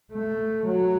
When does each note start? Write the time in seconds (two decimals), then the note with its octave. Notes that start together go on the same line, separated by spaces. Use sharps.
0.13 A3
0.66 F#3